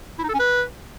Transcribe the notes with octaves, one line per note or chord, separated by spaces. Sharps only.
E4
D#4
A4
C#4
B4